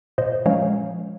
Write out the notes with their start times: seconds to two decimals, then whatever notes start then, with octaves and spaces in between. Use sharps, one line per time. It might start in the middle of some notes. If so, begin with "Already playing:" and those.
0.18 A#2 C5 D#5
0.46 F3 G#3 C#4 C#5 F5